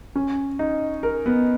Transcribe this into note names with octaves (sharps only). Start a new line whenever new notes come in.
C#4
D#4
A#4
B3